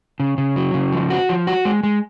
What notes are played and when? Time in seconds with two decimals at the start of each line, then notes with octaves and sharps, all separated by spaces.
0.20 C#3
0.38 C#3
0.56 F#3
0.74 C#3
0.93 F3
1.10 F#4
1.29 F3
1.47 F#4
1.65 G#3
1.83 G#3